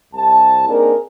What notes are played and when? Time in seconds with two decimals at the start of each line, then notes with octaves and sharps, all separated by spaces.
0.14 C2 A5
0.68 A#3 C4 D4 D#4 G#4 A#4